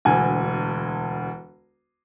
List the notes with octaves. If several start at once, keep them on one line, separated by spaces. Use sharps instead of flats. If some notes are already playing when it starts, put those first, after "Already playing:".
E1 D2 G#5